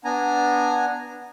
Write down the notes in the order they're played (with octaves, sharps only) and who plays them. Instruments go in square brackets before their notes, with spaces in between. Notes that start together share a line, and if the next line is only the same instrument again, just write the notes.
[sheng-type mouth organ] B3 D4 G#5 A#5